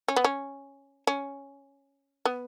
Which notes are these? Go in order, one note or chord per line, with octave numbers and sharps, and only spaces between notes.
C#4
B3
C#4
C#4
B3